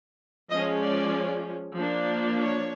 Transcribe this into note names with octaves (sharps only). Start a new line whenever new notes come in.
F3 G#3 C#4 D#5
D5
F3 A#3 D4
C#5